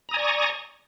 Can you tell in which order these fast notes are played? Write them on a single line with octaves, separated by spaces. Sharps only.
A#5 D#6 G#5 D5 C#6